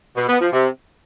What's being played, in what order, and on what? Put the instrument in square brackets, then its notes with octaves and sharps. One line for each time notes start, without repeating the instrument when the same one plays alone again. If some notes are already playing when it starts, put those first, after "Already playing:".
[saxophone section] B2
B3
F3
C3